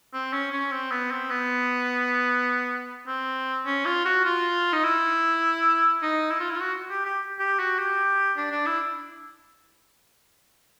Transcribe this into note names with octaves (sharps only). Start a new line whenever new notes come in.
C4
C#4
C#4
C4
B3
C4
B3
C4
C#4
F4
F#4
F4
D#4
E4
D#4
E4
F4
E4
F4
F#4
G4
G4
G4
F#4
G4
D4
D4
E4